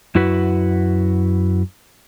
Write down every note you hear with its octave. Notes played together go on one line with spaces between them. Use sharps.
F#2 E4 F#4 B4